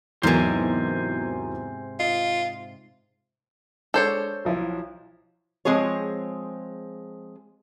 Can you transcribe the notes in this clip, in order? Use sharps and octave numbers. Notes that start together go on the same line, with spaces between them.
E2 G#2 C3 F#3 A#4 C5 G#5
F4 D#5
G#3 D4 A4 C5 C#5
B1 F3 E4
F3 G#3 C4 G#4 C#5